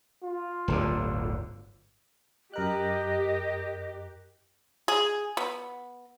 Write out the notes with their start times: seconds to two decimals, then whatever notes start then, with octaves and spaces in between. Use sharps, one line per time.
0.24 F4
0.68 D1 G1 D3
2.54 F#2 G4 A#4 D#5 F#6
4.88 G#4
5.37 B3